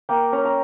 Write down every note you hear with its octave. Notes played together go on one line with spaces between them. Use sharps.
A#3 G5
C#4 A#5
A#5